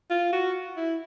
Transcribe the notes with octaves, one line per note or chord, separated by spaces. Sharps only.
F4
F#4
E4